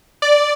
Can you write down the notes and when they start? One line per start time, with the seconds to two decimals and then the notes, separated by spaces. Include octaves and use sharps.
0.22 D5